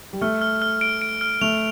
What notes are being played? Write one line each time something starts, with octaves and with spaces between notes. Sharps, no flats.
G3
A3 F6
F6
F6
D7
D7
F6
A3 F7